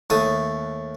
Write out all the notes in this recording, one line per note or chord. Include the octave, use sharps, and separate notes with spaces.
D#2 A3 A5 D#6